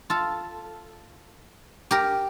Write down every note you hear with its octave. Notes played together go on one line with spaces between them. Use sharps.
F4 A4
G4 A#4